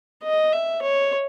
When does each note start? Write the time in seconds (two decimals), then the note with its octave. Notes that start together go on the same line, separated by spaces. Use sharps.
0.24 D#5
0.53 E5
0.82 C#5